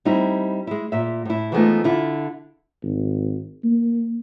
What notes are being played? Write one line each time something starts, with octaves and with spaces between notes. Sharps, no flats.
G3 C4 D#4 E4
G#3 E4
A#2 E5
A2 E4
E3 F3 G#3 A3 B3 D#4
D3 E4 F4
G#1
A#3